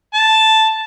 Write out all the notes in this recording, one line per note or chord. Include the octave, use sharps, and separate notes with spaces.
A5